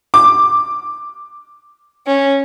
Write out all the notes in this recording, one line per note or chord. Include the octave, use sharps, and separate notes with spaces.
D6
C#4